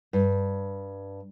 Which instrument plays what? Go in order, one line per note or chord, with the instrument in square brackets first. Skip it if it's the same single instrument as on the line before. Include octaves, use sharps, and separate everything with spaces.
[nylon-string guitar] G2